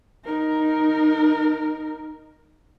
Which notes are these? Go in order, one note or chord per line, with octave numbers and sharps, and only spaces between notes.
D#4 A#4